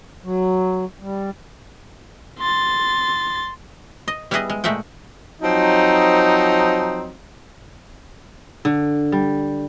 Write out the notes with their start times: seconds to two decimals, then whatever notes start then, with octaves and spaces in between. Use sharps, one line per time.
0.24 F#3
1.01 G3
2.39 C6 A6
4.08 D#5
4.31 G3 B3 E4 G#4 B4 D#5
4.50 G#3
4.64 A#2 G#3 A3 E5 F#5 G5
5.42 F3 F#3 C4 D#4
8.65 D3
9.12 G3